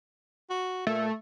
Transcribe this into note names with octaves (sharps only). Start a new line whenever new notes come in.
F#4
A#2 A3